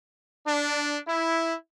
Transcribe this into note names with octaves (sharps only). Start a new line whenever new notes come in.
D4
E4